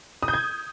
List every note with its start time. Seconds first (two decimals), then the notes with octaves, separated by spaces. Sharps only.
0.23 D#6
0.28 G6
0.34 G#6